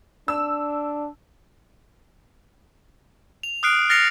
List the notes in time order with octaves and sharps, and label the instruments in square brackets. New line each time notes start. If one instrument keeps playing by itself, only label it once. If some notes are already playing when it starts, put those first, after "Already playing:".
[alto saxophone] D4 [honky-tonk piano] E6
[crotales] F7
D#6 F6 F#6 C7 D7
F6 A6 A#6 C7 C#7 F7